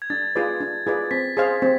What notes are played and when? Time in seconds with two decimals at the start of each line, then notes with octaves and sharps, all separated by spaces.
0.02 G#6
0.10 D4 A6
0.35 F4 G#4 B4 D5
0.60 D4
0.87 F4 G#4 B4 D5
1.11 C4 B6
1.37 G#4 C5 F5
1.62 C4